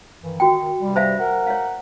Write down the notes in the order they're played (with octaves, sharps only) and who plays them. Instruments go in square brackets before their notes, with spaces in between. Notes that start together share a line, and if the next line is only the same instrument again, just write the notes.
[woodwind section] G2 D#3 E3
[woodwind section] D#3 [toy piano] F#4 G5
[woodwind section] G2 C3 G3
[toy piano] C5 E5 F5
[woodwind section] A#4 F#5
[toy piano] C#5 F5